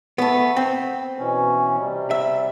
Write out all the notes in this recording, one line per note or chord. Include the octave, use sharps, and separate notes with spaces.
A3 B3
C4
B2 E3 C#4
C3 G3
E5